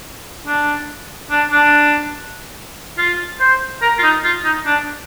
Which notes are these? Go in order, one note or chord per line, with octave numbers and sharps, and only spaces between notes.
D4
D4
D4
F4
C5
A#4
F4
D#4
F4
D#4
D4